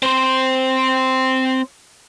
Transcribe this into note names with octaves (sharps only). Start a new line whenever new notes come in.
C4 C5